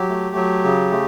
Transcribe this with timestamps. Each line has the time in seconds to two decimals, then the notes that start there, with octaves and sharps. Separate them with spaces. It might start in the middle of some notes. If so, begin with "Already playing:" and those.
Already playing: F#3 G4
0.09 A3
0.36 F#3
0.64 C#3
0.91 A3